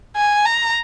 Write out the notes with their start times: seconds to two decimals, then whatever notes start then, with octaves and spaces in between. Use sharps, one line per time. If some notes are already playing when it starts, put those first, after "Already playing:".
0.16 G#5
0.45 A#5